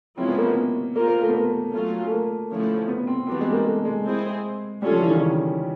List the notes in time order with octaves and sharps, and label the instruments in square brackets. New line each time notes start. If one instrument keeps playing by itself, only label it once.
[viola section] F3 G#3 C#4 E4 [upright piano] C4
[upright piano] B3
A#3
B3
[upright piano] A#3 [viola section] C4 F4 A#4
[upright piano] A#3
A3
B3
A#3
[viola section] F#3 A3 C#4 F4
[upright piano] A3
A#3
[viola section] D3 F3 A3 C#4 E4
[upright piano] B3
C4
[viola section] E3 G3 B3 D4 F#4 [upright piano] C4
[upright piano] G#3
A#3
A3
G#3
[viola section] C4 E4 G#4 C5
[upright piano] G3 [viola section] C#4 F4 A4 C#5
[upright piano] F3
E3
D#3
C#3